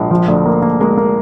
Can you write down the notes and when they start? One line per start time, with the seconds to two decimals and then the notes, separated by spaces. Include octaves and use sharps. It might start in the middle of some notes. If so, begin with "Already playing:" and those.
Already playing: A#1 G#3
0.11 F3
0.28 D2
0.46 A#3
0.62 A#3
0.80 G#3 A#3
0.97 A#3